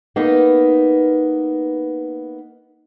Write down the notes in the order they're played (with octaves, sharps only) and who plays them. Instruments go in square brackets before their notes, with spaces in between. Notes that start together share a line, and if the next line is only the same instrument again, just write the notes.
[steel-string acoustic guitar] A#3 B3 D#4 B4